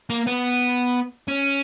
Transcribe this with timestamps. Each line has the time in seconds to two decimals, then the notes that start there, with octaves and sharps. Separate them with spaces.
0.10 A#3
0.27 B3
1.28 C#4